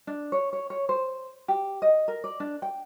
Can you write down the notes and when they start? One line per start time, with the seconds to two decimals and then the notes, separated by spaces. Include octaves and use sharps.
0.07 D4
0.32 C#5
0.53 C#5
0.70 C#5
0.89 C5
1.48 G4
1.82 D#5
2.08 A#4
2.24 D5
2.40 D4
2.62 G5